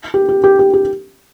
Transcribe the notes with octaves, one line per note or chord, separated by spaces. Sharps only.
G4
G4
G4
G4
G4